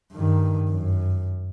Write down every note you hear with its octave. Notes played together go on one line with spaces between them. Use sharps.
G2 D#3
F#2